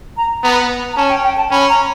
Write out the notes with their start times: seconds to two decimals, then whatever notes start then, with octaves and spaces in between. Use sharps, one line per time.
0.17 A#5
0.43 B3 A#5
0.93 A#5
0.97 C#4 A5
1.10 G5
1.23 G5
1.37 A5
1.51 C#4 B5
1.69 A#5